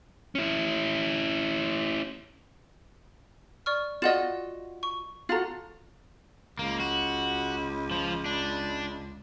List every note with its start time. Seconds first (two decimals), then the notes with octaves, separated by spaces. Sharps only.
0.35 C#4 E4
3.66 D5 C#6 F6
4.02 F4 F#4 D5 D#5 F#5 E7
4.83 C#6
5.29 F4 F#4 A4 F5 A#5
6.59 C#2 A#3
6.80 F#4
7.91 F3
8.26 D4